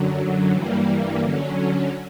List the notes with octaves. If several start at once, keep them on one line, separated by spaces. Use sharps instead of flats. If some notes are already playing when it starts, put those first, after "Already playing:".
Already playing: F#2 D3 F#3
G2 E3 G3 A#3
D3 F#3 C#4